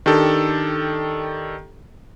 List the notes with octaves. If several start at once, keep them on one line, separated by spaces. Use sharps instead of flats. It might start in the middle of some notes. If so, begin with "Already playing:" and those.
D#3 D4 G4 A4